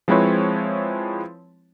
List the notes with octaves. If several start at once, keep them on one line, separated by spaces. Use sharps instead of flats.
F3 G#3 C4 E4 B4 C#5